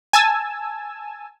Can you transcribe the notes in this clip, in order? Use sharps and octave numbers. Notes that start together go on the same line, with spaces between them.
G#5 A5 E6